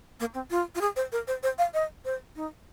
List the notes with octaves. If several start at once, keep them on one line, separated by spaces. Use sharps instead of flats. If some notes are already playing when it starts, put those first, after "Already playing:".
A#3
C4
F4
F4
G#4
C5
A#4
C5
C5
F5
D#5
C5
D#4